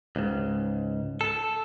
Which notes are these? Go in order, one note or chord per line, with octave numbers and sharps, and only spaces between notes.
C#2 G#2
A4